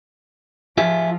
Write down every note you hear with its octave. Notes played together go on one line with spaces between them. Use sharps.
F3 F4 G#4 E5